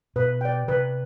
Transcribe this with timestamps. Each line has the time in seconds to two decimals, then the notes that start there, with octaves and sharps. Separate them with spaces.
0.16 B2 B4
0.41 D5 G5
0.68 C3 B4